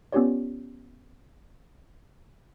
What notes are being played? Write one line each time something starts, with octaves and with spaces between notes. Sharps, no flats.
B3 C#4 F4 G4 C#5 D5